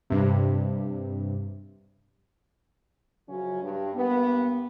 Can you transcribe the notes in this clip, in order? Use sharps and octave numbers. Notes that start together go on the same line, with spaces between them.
G2 C3
F#2 C#3 F3 F#3 C#4
G2
G2 A#3 B3